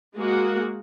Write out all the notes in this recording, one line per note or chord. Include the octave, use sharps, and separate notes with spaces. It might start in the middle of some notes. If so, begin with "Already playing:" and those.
G#3 A#3 F#4